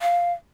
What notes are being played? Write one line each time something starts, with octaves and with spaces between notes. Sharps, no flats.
F5